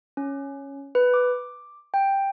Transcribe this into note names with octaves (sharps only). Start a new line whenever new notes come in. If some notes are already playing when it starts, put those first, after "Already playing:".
C#4
B4
D6
G5